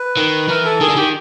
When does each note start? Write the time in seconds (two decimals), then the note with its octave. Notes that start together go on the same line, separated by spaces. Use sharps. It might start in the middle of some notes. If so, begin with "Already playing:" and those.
Already playing: B4
0.17 D#3
0.49 E3 A#4
0.65 A4
0.81 D#3 G#4
0.89 D3
0.96 D#3 G4